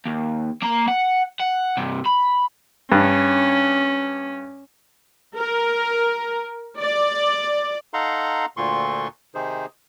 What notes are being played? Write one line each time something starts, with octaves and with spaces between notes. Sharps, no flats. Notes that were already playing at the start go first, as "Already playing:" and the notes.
D#2
A#3 A#5
F#5
F#5
G2 C3
B5
G2 C#4
A#4
D5
D#4 A4 F5 F#5 A#5 C6
D2 A#2 D3 F4 C6 C#6
C3 D#3 D#4 G#4 C5